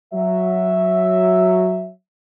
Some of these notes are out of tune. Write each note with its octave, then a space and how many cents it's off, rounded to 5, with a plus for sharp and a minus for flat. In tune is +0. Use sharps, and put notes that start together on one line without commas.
F#3 -5 E5 +0